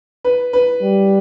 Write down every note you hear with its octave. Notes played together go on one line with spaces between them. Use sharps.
B4
B4
G3